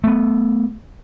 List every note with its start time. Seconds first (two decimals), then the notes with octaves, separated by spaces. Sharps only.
0.04 A3 B3